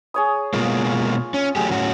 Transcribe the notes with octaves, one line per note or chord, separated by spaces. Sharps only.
G#4 C#5 D#6
B2 G#3 A#3 F4
C#4
F#3 A3 G4 G#4
A2 C#4 F#4